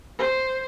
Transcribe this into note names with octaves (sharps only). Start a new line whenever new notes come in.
C5